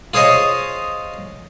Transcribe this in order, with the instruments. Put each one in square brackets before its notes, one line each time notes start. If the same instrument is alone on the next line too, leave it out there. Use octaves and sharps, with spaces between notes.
[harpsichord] F4 G#4 C5 C#5 D#5